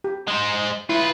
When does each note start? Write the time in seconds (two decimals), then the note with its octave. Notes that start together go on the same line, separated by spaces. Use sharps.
0.04 G4
0.28 G#3 C5
0.89 E4 F4 B4